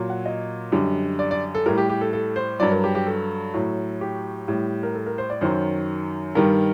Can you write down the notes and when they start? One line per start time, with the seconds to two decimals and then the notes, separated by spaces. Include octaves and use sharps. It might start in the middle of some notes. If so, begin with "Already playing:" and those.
Already playing: A#2 F#3
0.10 F#5
0.26 D#5
0.72 F#2 D3 G3
1.19 D5
1.31 D5
1.55 A4
1.66 A2 G3 A#4
1.78 G4
1.89 G4
2.01 A4
2.13 A4
2.36 C5
2.60 G2 F#3 D5
2.72 A#4
2.84 G4
2.95 G4
3.07 A4
3.54 A2 F#3
4.01 G4
4.48 A2 G3
4.83 A#4
4.95 A4
5.06 A#4
5.18 C5
5.30 D5
5.41 F#2 D#3 F#3 C5
6.35 G2 D#3 G3 A#4